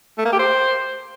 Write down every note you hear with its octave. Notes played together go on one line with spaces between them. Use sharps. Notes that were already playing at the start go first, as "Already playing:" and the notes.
A3
A#3
G4
C5